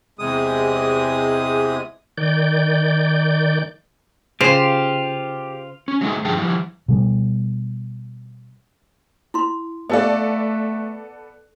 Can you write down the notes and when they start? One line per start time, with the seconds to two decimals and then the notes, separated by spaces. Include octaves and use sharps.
0.19 E2 C3 G#3 D#6
2.18 D#3 D5 G6
4.41 C#3 F4 G4 C5
5.88 C#4
6.01 F#3 G#3 A3 D#4
6.24 G2 D3 F3 G#4 G5 A5
6.37 E3 F3 G3
6.88 B2 G3 B3
9.34 E4 C6
9.90 A3 B3 A4 D5 D#5 F5